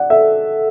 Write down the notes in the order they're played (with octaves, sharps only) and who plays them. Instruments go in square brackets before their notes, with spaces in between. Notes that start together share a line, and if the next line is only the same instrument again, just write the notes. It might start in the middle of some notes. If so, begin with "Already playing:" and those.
Already playing: [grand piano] D5 F#5
[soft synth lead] A4 [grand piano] E5